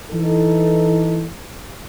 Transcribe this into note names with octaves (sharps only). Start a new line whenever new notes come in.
E3 D#4 A4